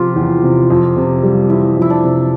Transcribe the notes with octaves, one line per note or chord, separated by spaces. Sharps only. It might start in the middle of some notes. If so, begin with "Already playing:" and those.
Already playing: C3 F3 F4 G4
E2
C3
F2
C3
G3
E3 E4
F2 E4
D4
C3